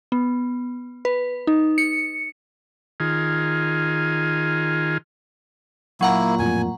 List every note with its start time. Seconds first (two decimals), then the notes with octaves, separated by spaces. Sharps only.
0.12 B3
1.05 B4
1.47 D#4
1.78 C#7
3.00 D#3 F4 G#4
6.01 A#2 F#3 A#3 E4 F#5 A#5
6.39 F2 A2 F3 G#5